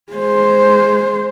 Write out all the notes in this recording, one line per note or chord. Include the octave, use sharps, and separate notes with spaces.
G#3 C5